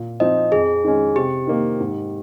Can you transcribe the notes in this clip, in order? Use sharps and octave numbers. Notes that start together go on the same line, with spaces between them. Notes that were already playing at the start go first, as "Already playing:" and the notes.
Already playing: A#2
F3 C4 D#4 D#5
F2 G#4
D#3 G#3 C#4
C3 G4
D#3 A#3
G#2